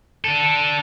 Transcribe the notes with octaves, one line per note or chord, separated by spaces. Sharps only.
D4 A4